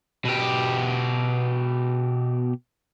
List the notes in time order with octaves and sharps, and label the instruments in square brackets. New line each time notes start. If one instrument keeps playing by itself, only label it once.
[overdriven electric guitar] B2 G4